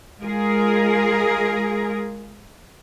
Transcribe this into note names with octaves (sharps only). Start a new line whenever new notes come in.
G#3 F4 G#4 A#4